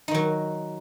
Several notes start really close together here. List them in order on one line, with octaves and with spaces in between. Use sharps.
D#4 D#3 F#3